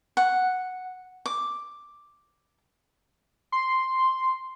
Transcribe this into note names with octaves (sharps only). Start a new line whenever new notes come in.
F#5
D6
C6